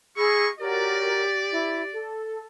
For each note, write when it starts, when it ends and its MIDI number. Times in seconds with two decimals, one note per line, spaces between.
0.17 0.49 58
0.17 0.47 68
0.17 0.49 75
0.17 0.46 83
0.17 0.49 85
0.17 0.46 88
0.59 1.25 66
0.59 1.90 67
0.59 1.25 70
0.59 1.25 73
0.59 2.12 74
1.52 1.81 64
1.94 2.46 69